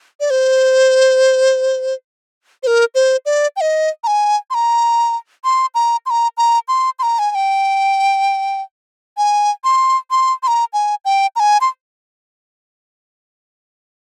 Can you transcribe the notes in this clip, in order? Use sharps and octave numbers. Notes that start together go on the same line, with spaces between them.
D5
C5
C5
A#4
C5
D5
G5
D#5
A#5
G#5
C6
A#5
C6
A#5
C6
A#5
A#5
C6
C6
A#5
G#5
G#5
G5
G#5
C6
C6
C6
A#5
G#5
G5
A#5
G#5
C6